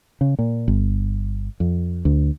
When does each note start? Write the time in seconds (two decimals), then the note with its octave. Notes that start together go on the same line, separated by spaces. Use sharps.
0.21 C#3
0.39 A#2
0.68 G1
1.60 F2
2.05 D2